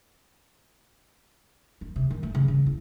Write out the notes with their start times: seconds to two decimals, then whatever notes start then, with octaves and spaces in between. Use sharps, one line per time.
1.81 D#3
1.96 C3
2.10 D#3
2.23 A3
2.35 C#3
2.48 C#3
2.66 E4